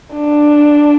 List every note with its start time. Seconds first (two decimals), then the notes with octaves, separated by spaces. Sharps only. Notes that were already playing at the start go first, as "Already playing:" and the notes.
0.14 D4